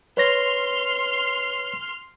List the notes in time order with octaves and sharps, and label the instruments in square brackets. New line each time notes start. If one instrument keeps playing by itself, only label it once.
[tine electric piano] B4 C#5 A#6 [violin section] C6 F6